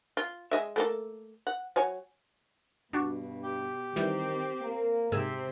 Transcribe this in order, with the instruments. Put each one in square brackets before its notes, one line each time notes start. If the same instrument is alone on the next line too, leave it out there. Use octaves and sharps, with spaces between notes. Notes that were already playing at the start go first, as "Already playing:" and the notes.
[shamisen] F4
G#3 D#5 E5
A3 A#3 A4
F#5
F#3 C#5 G#5
[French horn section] G2 [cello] B2 [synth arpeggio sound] D4 F#4
[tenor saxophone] G4
[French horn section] D#3 [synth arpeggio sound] E3 G3 G6 [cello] C4
[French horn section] A#3
[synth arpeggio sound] G#2 G#4 E6 [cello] C3 [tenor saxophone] C4